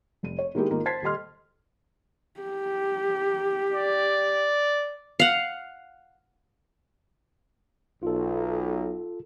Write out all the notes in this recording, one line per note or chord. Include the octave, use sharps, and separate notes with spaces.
F1 D#7
C#5
D#3 G#3 A#3 E4 G4 G#4
G#1 A#3 D#4 F4
C5 A5 G#6 A6 B6 C7
D#1 G3 A4 D#5 C6 F6
G4
D5
F5 F#5
B1 F4 A4